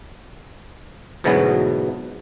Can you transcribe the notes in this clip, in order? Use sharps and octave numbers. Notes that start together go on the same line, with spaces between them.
D2 G#2 B2 E3 F#3 B3